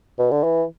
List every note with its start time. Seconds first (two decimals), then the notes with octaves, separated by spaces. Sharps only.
0.19 B2
0.31 D3
0.44 E3